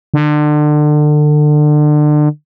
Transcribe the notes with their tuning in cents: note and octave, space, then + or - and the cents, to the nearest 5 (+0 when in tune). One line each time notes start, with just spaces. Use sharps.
D3 +30